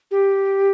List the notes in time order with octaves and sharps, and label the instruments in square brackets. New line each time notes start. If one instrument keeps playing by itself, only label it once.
[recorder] G4